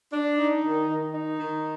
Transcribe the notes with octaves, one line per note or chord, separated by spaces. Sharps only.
D4
D#4
D#3
D#3
D#4
D#3